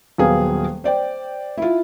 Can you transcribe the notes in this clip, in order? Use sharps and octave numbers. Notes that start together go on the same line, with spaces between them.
D#1 F#3 B3 G#4 F5
C5 D5 G5
E4 F4